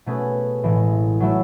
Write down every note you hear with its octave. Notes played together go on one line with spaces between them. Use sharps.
B2 A3 C#4 G#4 B4
A1 A2 E3 G#3
F#3 A3 E4